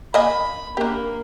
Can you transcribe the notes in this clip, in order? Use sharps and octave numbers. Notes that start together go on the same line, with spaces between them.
A#3 D#5 G#5 B5
A#3 D4 G4